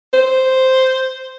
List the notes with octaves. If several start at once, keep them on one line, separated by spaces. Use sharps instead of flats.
C5